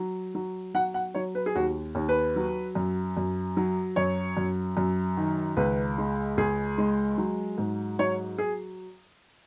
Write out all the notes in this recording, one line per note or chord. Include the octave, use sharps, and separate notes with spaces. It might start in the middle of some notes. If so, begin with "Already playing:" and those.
Already playing: F#3
F#3
F#3 F#5
F#5
F#3 C#5
B4
G#4
D#2 F#4
D#2
B4
F#3
F#2
F#2
F#3
F#2 C#5
F#2
F#2
D#3
C#2 B4
G#3
C#2 G#4
G#3
F#3
G#2
F#3 C#5
G#4